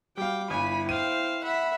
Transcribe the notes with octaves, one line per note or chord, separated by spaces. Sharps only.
G3 F#4 F5 G5 D6
G1 E4 G#5 B5
C5 F5 G5 D#7
E5 F#5 B5